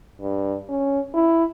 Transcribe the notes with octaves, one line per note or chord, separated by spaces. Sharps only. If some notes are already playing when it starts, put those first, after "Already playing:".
G2
C#4
E4